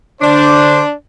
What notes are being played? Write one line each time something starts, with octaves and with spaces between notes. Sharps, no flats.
D3 D4 C5 D5